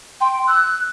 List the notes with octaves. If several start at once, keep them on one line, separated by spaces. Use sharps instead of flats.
G5 C6
E6 F#6